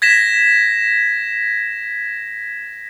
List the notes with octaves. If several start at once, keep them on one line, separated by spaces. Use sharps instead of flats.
G#6 A#6 B6 E7